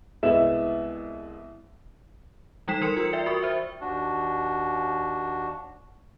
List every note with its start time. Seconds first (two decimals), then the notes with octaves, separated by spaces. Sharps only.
0.23 C2 G#3 B3 E4 E5 E7
2.68 E3 G3 D#4 G5 B6 E7
2.81 E3 A#4 C6 C#7
2.97 F4 A#4 E6
3.13 D5 E5 G5
3.26 F#4 A#4 C#6
3.43 C5 E5
3.81 D#2 D4 F#4